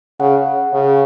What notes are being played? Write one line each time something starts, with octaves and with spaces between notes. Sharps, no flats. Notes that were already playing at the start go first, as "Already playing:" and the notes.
C#3 F#5
C#3